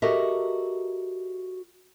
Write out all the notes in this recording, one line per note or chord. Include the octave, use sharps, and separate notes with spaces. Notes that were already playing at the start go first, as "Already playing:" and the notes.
F#4 G4 A4 A#4 D#5 E5